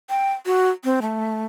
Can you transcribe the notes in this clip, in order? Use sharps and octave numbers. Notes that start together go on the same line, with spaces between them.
G5
F#4
C4
A3